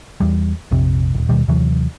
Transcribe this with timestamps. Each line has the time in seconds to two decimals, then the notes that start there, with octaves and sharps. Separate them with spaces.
0.20 E2 G3
0.71 A#1 F2 C3
1.14 D#1 C2
1.29 D#2 B2 D#3 G3
1.48 D#2 C3 E3 F#3